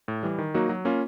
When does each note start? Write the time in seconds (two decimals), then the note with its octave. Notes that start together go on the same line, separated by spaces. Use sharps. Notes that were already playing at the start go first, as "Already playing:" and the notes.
0.08 A2
0.23 E3 G3
0.38 D#3
0.54 F#3 A#3 D#4 F#4
0.69 F#3
0.85 A#3 C#4 F4